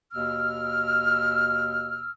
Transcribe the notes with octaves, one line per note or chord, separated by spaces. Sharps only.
D#2 B2 E6 F6